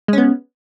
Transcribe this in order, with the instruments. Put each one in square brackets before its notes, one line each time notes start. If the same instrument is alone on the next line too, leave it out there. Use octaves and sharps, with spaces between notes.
[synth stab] G#3
C#4
B3